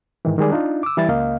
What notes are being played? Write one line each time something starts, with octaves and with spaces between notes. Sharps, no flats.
G#2 D#3 E3
D#3 G3 G#3 G#4 D5
D4 D#4 F4
D6 E6
E3 G3 E4 E5 A6
C#2 A#3 D#5 F5